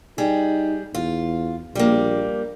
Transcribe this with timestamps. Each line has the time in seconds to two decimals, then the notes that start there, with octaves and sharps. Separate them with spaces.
0.18 G3 D#4 G#4
0.94 E2 F4
1.75 A#1 G3 A#3